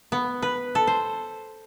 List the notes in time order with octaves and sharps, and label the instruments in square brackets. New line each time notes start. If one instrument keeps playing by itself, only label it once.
[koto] B3
B4
A4
C5